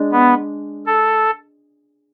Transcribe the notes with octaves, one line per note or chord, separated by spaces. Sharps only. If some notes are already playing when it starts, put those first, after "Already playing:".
Already playing: G#3 D4
B3
A4